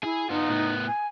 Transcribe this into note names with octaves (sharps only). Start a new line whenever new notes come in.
E4 G#4
B3 D#4 F4
A2 B3
G#5